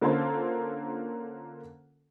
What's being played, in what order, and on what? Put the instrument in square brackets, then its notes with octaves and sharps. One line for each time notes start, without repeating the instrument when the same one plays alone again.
[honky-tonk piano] D3 A#3 C#4 F4 A4 C5